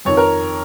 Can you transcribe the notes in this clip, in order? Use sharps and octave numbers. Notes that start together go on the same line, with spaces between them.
F2 D#3 C#5
A#4